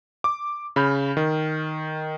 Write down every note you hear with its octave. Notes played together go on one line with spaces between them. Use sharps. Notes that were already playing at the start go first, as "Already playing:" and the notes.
D6
C#3 B5 F6 G6
D#3